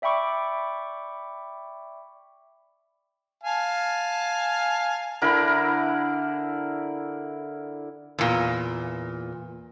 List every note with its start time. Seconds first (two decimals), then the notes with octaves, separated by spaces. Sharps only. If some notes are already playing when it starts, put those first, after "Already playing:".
0.02 D5 E5 G5 B5 C#6 D6
3.44 F5 G#5 A5
5.22 D3 E4 A#4 B5
8.19 E2 A#2